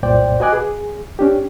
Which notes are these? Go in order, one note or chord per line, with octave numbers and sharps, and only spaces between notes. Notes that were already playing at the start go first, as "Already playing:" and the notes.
C2 F#2 A#2 C5 D5 G5
F#4 B4 D#5 G#5 D6 F#6
G#4
C#4 D4 G4